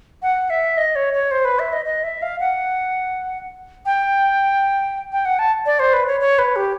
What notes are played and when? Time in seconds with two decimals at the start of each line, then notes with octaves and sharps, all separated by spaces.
0.22 F#5
0.50 E5
0.77 D#5
0.96 C#5
1.14 C#5
1.31 C5
1.45 B4
1.59 E5
1.73 D#5
1.85 D#5
2.04 E5
2.22 F5
2.40 F#5
3.86 G5
5.12 G5
5.25 F#5
5.39 A5
5.66 D5
5.79 C5
5.93 B4
6.07 C#5
6.20 C#5
6.39 B4
6.56 G4